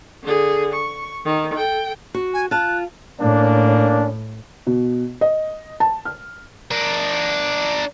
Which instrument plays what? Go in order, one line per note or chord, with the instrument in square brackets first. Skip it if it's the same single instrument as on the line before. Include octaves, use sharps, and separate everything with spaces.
[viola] D3 G#4
C#6
D#3
A4 G5
[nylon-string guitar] F#4
[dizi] G#5
[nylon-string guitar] F4 A5 [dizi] F#6
[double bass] A2 [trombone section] A#3 C#4 D4
[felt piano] B2
D#5
A5
F6
[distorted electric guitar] D4 A#4